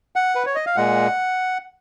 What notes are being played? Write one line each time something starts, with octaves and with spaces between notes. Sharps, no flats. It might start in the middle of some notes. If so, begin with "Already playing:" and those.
F#5
B4
C#5
D#5
F5
A#2 G#3 F#5